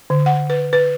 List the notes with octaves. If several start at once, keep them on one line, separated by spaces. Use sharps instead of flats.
D3
F#5
B4
B4